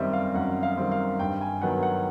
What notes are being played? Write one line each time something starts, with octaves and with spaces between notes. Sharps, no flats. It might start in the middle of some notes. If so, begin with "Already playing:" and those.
Already playing: F#2 D#3 G3 C4 D#5 E5
F5
F#2 F#5
F5
D#3 G3 C4
F5
G2 G5
G#5
D#3 F#3 B3 F#5
F#5